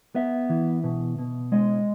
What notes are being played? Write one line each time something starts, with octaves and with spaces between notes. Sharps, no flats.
B3 E5
E3
B2
B2
G#3 D#5